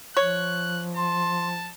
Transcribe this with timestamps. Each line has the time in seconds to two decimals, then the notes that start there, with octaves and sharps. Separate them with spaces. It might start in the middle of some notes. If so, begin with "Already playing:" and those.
0.17 F3 C#5 F#6
0.96 A5 C6